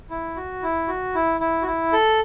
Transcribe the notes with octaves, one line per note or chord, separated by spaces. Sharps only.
E4
F#4
E4
F#4
E4
E4
F#4
E4
A4